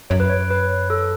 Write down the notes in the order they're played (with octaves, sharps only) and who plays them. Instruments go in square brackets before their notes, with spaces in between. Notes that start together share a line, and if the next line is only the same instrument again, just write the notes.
[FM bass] F#2 [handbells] C#5
[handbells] B4
C#5
B4
A4